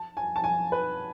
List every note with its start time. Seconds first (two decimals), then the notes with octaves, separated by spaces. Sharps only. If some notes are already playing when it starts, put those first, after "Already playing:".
Already playing: A5
0.17 G#5
0.36 A5
0.44 G#5
0.72 B4